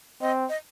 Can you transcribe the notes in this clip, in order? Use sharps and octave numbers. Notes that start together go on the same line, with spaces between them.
C4 D#5
D#5